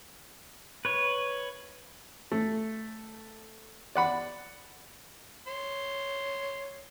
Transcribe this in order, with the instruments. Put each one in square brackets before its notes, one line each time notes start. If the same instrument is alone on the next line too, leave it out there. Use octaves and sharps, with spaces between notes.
[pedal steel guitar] B4 C#5
[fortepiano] A3
D5 F#5 B5
[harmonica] C#5 C6